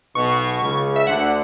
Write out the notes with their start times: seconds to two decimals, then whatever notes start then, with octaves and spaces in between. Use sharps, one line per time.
0.15 B1 B2 C#6
0.62 C#2 C#3
0.96 E5
1.07 D2 D3 F#5